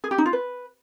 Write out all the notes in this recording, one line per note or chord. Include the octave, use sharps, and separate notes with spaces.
G#4
G4
D#4
F4
B4